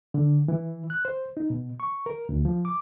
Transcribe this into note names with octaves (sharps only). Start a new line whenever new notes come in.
D3
E3
F#6
C5
D#4
B2
C#6
A#4
D2
F3
D6